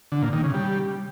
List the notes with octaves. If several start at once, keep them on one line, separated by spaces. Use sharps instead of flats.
D3
A#2
D#3
C#3
G3